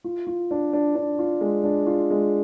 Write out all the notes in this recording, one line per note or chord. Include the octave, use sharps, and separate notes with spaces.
F4
F4
D4
D4
D4
F4
G#3
D4
F4
G#3